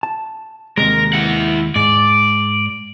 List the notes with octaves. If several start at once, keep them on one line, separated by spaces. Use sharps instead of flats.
A5
D#2 C3 G#3 A#4
E4 F#5
G#2 D5